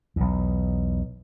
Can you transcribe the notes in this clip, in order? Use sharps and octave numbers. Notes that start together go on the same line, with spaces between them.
B1 E2